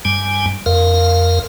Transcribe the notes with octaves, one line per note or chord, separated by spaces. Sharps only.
G2 G3 G#5
F2 A#4 F5